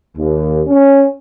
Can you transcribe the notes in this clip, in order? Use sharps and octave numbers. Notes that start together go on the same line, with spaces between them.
D#2
C#4